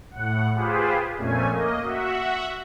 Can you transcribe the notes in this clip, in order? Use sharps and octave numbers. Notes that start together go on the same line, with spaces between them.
A2 F#5
F4 G4 G#4 B4 C5
F2 A#2 A3 C#4 G#5
A#3 D#5
F#4 E5 F#5